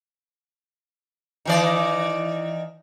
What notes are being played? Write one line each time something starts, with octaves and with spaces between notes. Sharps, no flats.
D#3 E3 D5